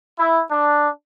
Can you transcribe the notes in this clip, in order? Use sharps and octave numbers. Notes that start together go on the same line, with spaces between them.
E4
D4